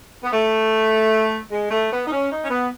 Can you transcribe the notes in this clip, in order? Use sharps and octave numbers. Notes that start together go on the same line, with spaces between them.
B3
A3
G#3
A3
B3
D#4
C#4
D#4
C#4
B3